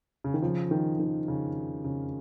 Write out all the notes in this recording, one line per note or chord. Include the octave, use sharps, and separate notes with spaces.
C#3
D#3
C#3 F3
D#3
D#3
C#3
C#3